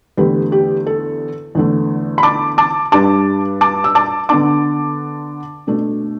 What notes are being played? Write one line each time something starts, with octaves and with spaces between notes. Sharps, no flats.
E2 D3 A3 E4 G4 B4
G4
A4
E2 D3 A3
B5
A5 D6
A5 D6
G2 G3 D4 A5 D6
A5 D6
E6
A5 D6
D3 B3 D4 A5 D6
B2 A3 D4